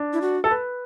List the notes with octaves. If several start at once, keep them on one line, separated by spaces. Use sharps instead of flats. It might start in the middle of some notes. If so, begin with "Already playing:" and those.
Already playing: D4
E4
F#4
A4
B4